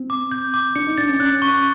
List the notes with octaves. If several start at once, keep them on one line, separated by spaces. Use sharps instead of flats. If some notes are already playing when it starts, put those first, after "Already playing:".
Already playing: C4
D6
G6
D6
D4 C#7
D#4
D4 A6
C#4
C#4 F#6
C#6